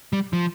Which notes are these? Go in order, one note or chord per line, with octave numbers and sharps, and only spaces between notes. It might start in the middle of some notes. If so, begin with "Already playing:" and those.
G3
F3